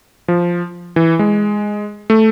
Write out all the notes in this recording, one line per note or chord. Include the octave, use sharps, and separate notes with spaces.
F3
E3
G#3
A3